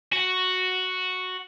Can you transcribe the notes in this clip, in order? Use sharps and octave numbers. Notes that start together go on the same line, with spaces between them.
F#4